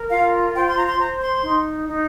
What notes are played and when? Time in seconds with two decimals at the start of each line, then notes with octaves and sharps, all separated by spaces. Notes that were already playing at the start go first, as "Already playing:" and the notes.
Already playing: A#4
0.09 F4 F5
0.55 C5 G5
0.68 C6
0.77 A#5
0.88 C6
0.99 C5 A#5
1.21 C6
1.43 D#4
1.88 D#4